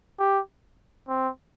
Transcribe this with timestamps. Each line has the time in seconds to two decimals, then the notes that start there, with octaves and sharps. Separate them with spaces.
0.19 G4
1.08 C4